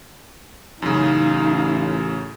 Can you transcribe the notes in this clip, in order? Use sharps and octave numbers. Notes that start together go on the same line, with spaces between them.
A1 F#2 C#3 D#4 F5